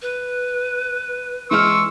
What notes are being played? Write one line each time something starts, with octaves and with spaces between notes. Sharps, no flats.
B4
E3 G#3 C6 C#6 E6 F6